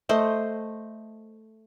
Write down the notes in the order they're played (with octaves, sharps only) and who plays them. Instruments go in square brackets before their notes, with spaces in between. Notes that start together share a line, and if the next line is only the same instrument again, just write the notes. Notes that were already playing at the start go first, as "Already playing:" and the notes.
[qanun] A3 C5 D#5